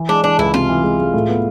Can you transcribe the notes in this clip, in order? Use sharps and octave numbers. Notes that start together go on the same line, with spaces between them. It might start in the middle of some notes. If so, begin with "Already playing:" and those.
Already playing: E3
G#3 D4
E3 D4
C#2 E4
C3 F4
E3
G#3
G#3
A2
B3